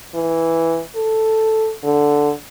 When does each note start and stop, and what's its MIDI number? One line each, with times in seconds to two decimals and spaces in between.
0.15 0.81 52
0.96 1.72 69
1.83 2.31 50